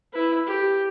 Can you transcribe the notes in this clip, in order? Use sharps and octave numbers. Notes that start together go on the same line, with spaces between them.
E4 B4
G4